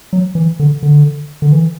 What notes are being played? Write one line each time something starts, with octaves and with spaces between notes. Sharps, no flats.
F#3
E3
D3
D3
D3
E3